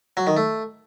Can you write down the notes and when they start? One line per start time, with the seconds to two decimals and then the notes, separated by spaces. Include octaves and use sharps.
0.17 F#3
0.27 D#3
0.37 A3